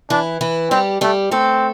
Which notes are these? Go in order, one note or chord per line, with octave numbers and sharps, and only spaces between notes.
E3 D4 E4
E3 E4
G3 C4 G4
G3 A3 G4
A3 C4 A4